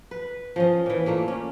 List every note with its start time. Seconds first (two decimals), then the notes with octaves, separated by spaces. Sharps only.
0.11 B4
0.56 F3 C#4 D#5
0.86 A#2 E3
1.06 A#2 A3 A#3
1.28 C#4